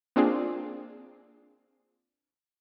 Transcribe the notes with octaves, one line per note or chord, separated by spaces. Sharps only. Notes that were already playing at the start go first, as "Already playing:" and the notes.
A#3 C4 D4 F4 G#4